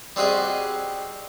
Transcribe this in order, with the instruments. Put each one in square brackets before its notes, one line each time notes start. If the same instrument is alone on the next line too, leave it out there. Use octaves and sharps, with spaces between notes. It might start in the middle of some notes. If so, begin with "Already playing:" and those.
[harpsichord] G3 C4 F#4 G#4 D#5